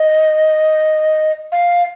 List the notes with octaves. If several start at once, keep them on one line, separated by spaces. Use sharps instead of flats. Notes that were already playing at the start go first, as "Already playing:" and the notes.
Already playing: D#5
F5